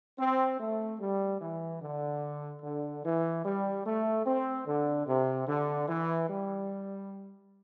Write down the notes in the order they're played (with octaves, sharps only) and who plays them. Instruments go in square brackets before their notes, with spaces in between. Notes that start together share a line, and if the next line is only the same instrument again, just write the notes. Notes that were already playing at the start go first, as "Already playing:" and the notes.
[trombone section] C4
A3
G3
E3
D3
D3
E3
G3
A3
C4
D3
C3
D3
E3
G3